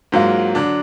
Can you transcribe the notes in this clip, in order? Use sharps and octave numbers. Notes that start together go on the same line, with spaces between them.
G#2 F#3 A#3 F4
D3 F#3 D4